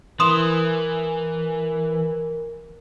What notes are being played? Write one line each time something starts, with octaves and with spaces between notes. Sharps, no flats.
E3 A#4 C6 D#6 E7